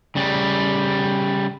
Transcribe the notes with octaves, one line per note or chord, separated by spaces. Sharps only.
C#3 G3